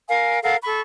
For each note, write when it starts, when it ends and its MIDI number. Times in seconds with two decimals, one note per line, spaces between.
0.09 0.38 70
0.09 0.38 77
0.09 0.38 80
0.42 0.56 69
0.42 0.56 70
0.42 0.56 77
0.42 0.56 78
0.64 0.80 69
0.64 0.80 83
0.64 0.80 85